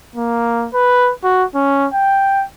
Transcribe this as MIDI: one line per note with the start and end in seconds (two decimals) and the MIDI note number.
0.16 0.68 58
0.74 1.12 71
1.24 1.45 66
1.55 1.87 61
1.93 2.45 79